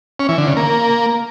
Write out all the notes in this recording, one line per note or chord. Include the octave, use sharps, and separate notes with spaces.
C#4
E3
D3
C#3
A#3